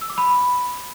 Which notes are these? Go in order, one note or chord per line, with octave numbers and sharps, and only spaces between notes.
E6
D6
B5